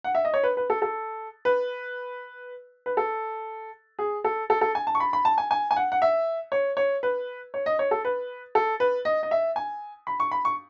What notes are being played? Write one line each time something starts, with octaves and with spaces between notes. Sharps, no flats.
F#5
E5
D#5
C#5
B4
B4
A4
A4
B4
B4
A4
G#4
A4
A4
A4
G#5
A5
C#6
B5
B5
A5
G#5
G#5
G#5
F#5
F#5
E5
C#5
C#5
B4
C#5
D#5
C#5
A4
B4
A4
B4
D#5
D#5
E5
G#5
B5
C#6
B5
C#6